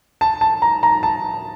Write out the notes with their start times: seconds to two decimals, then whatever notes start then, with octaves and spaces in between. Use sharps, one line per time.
0.21 A5
0.41 A5
0.62 A#5
0.83 A#5
1.03 A5